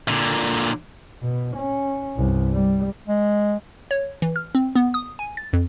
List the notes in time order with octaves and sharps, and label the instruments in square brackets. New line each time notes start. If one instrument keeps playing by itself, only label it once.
[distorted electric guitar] A#2 D3
[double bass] B2
C#4
C2 G2
G3
[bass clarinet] G#3
[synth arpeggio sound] C#5
E3
F6
C4
B3
D#6
G#5
A6
F2